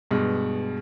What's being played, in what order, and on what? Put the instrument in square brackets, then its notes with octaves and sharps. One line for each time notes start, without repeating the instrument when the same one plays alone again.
[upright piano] G2 B2 G#3